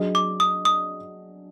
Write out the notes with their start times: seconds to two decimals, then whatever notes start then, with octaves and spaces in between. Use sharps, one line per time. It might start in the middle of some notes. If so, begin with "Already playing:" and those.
Already playing: F#3 D4 G#4 D#5
0.15 D6
0.40 D#6
0.65 D#6